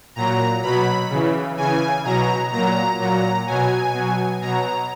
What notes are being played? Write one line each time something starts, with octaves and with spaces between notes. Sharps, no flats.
A#2 F#3 A#5
B2 F#3 B5
C#3 E3
C#3 E3 G#5
B2 F#3 A#5
A#2 F#3 A#5
A#2 F#3 A#5
B2 F#3 G#5
B2 F#3
B2 F#3 A#5